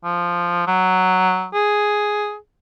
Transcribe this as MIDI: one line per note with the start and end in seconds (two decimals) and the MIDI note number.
0.04 0.65 53
0.67 1.47 54
1.54 2.36 68